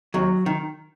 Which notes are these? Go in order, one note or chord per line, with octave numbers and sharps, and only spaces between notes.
D#2 F#3
D#3